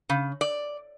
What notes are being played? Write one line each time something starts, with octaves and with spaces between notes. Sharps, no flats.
C#3
D5